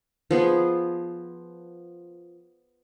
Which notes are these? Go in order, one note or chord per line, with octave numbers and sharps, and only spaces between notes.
F3 B3 G#4